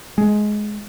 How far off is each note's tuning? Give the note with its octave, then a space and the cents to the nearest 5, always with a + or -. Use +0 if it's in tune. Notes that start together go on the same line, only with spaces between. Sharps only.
G#3 +15